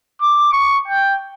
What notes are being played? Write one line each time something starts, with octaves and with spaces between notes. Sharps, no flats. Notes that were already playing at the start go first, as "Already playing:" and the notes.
D6
C#6
G5